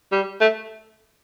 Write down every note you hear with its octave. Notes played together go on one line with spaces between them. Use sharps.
G3
A3